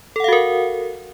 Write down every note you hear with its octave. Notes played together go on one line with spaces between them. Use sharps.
F#4 A4 A#4 F5 F#5